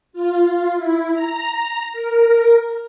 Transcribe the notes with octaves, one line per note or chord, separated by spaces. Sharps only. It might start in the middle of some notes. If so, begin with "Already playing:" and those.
F4
E4
A#5
A#4